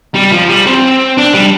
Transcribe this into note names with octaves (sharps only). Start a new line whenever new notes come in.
G3
F3
G3
C4
D4
G3